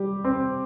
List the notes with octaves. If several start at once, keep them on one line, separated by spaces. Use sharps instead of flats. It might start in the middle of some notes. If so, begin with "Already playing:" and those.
Already playing: G3 G4
C4